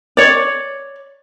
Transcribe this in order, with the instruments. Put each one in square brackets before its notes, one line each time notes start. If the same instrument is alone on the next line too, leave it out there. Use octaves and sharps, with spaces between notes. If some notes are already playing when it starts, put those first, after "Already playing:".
[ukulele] C#5 D5